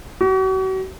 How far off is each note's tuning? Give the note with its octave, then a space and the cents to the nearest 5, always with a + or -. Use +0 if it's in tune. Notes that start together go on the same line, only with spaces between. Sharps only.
F#4 +40